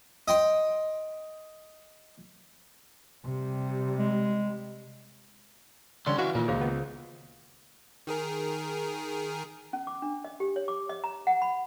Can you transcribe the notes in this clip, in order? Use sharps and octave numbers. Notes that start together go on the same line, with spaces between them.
D#5 G5 C6
C3 G3
G#3
D2 D3 G3 C#4 C6
E3 F#4 E5 F5
A#2 D#3 A#3 F4 A#4
C#2 G#4 C5 F5
B3
D#3 G#4 A#4
C#4
D6
D4
D#5
G4
C#5
D6
D#5
A#5
F#5
B5